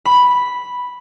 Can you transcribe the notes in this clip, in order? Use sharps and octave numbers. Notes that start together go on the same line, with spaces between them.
B5